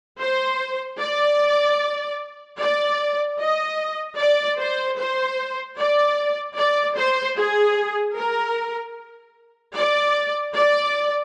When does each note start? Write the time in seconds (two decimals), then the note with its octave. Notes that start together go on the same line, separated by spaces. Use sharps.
0.20 C5
1.01 D5
2.60 D5
3.40 D#5
4.18 D5
4.59 C5
4.98 C5
5.78 D5
6.57 D5
6.97 C5
7.38 G#4
8.17 A#4
9.76 D5
10.55 D5